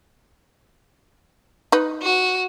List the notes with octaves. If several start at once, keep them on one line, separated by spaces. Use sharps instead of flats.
D#4 B4
F#4